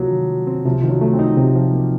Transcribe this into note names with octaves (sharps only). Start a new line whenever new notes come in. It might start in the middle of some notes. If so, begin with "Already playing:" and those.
Already playing: C3 F3 F#3 A#3
D#3
F#3
C4
C3 F3
D#3 F3
F#3
A3
C4
D#4
C3
F3
A#3